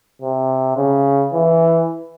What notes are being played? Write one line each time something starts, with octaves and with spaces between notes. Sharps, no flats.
C3
C#3
E3